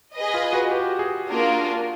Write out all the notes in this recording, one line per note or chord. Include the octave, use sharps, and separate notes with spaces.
G#4 B4 D#5
F4
F#4
G4
G#4
A#3 D4 F4 A#4